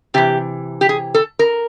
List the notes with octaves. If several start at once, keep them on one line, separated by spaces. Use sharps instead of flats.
C3 E3 G4
G4
G#4
A4
A#4